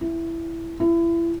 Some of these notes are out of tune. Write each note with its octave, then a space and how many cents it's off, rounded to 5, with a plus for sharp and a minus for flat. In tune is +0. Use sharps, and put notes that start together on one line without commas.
E4 +10
E4 +30